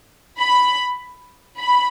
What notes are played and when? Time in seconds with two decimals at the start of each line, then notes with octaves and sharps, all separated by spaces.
0.41 B5
1.59 B5